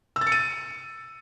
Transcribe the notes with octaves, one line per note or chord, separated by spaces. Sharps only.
E6
A6
C#7
D#7